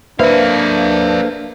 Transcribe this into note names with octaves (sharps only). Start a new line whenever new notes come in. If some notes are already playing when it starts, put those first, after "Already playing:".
A#3 D4 A4 B4 C5 E5 F5